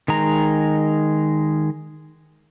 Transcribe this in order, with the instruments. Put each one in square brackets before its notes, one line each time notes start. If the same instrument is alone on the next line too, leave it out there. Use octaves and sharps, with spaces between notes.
[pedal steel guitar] D#3 G#3 A#5